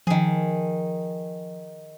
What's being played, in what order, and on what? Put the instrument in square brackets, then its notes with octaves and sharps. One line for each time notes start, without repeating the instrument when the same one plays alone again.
[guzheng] D#3 G#4 [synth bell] F3